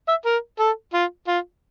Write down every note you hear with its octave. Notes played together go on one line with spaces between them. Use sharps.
E5
A#4
A4
F4
F4